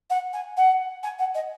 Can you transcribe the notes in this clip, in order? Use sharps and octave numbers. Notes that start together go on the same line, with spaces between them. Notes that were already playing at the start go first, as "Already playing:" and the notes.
F#5
G#5
F#5
G#5
F#5
D#5